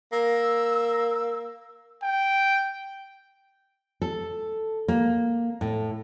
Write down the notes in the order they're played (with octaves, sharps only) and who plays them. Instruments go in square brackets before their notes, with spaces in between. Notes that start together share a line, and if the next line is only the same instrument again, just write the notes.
[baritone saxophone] A#3 [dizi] E6
[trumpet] G5
[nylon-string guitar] A4
A#3
A2